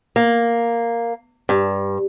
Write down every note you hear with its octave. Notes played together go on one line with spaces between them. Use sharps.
A#3
G2